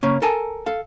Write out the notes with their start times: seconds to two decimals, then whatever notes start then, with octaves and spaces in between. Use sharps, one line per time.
0.03 C#3 A#3 C#4
0.22 A4 A#4 G#5 A5
0.66 A4 F5